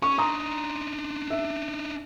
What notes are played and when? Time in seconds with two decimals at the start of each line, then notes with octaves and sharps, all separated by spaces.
0.02 C#4 C#6
0.18 D4 D#4 A#5 C6 D#6
1.30 E5